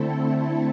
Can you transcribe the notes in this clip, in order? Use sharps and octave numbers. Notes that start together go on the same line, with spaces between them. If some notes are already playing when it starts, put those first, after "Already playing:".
Already playing: D3 A3 C4 E4 A4